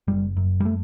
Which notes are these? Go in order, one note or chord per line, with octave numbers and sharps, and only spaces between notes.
F#1 G3
F#2
G3
A3